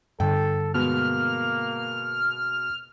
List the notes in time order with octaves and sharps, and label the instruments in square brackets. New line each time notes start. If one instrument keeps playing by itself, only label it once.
[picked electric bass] G2 D3 [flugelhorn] A4 [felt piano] G5
[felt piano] B2 G#3 B3 [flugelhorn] A#3 [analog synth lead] F6